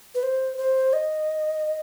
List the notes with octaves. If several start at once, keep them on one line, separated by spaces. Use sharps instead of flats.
B4
C5
C5
D#5